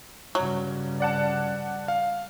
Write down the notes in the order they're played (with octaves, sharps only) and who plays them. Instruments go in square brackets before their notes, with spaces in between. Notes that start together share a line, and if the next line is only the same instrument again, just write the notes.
[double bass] G2 C#3 [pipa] F#3
[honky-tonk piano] D5 F#5 A5
[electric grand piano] F5